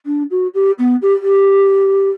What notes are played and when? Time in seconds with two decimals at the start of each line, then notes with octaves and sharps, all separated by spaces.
0.06 D4
0.30 F#4
0.54 G4
0.78 B3
1.02 G4
1.21 G4